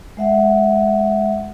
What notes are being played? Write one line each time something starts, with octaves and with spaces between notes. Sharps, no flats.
G#3 E5 F#5